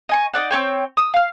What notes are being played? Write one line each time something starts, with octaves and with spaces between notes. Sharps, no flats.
D#5 G#5 C#6
D#4 B4 D5 F#5
C4 C#4 C#5 G5
D#6 E6
F5 F6